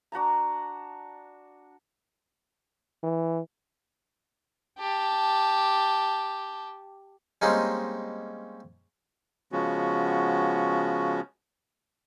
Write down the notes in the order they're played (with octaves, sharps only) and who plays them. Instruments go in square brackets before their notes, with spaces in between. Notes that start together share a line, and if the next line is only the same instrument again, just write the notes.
[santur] D4 F#4 A5 A#5
[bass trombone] E3
[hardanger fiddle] G4 A5
[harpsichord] G3 G#3 A#3 C4 C#4 D#4
[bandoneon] C#3 F3 G#3 B3 C#4 F#4